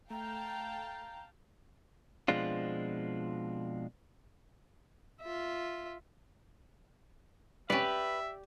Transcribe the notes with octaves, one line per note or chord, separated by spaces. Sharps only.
A3 F5 G5 A5 A#5
B2 F3 G#3 C4 D4 F4
F4 E5
G3 C#4 G4 B4 D5 E5